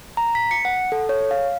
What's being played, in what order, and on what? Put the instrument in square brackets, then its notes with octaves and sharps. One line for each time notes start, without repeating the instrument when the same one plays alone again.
[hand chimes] A#5
B6
C#7
F#5
A4
C#5
F5